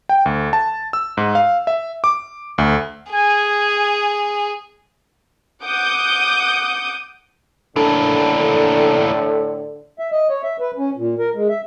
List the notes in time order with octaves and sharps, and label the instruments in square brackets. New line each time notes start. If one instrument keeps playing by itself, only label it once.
[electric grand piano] G5
D2
A5
E6
G#2
F5
E5
D6
D2
[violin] G#4 [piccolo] G#5
[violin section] F#5 D6 D#6 G6
[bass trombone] A2 [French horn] D3 [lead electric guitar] E3 A#3 [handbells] D4 A4 A5
[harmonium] E5
D#5
C#5
E5
B4
C#4
A#2
A#4
G#3
E5